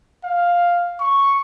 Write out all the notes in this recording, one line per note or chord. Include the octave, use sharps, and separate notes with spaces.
F5
C#6